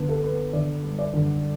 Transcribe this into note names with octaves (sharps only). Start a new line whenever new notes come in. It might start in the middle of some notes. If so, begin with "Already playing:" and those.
Already playing: D3 B3
A4
B3
D3 D5
G3
D5
D3